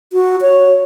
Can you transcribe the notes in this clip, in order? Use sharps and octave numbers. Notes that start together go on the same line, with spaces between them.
F#4
C#5